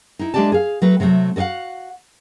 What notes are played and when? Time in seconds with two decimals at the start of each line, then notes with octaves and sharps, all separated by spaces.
0.19 D#4 E4
0.34 G#3 A3 D4 G4 D5 A5
0.52 G#4 F5
0.82 F#3 A3 B4
1.00 C3 F#3 G#3 A3
1.36 F#4 A4 D#5 F5 F#5